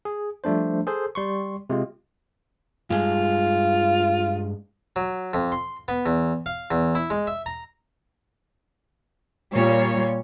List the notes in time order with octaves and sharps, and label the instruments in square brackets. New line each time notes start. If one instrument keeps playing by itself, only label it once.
[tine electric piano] G#4
F3 G3 A3 D4 C5
G#4 A4 C5
G3 C6 C#6
C3 G#3 F4
[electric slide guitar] G2 G#3 [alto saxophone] F4
[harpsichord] F#3
F2
C6
B3
E2
F5
E2
E4
G#3
E5
A#5
[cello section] A#2 G3 C#5